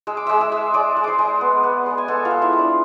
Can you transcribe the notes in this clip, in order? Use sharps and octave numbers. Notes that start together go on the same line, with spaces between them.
G#3 E6
D6
G#3 E5 E6
E5 E6
G#3
G#3 D5 D6
G#3
C5 C6 D6
G#3
B3
B3
G#3
G#5
B3 A4 A5
F4 F5
G#3
E4 E5
F4
D4 D5